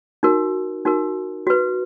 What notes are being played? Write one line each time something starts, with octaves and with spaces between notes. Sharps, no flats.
D#4 F#4 A#4
D#4 F#4 A#4
F#4 B4